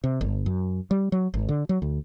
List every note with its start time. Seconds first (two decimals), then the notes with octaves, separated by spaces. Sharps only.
0.04 C3
0.21 G1
0.46 F#2
0.91 G3
1.12 F#3
1.34 G#1
1.49 D3
1.69 F#3
1.82 D2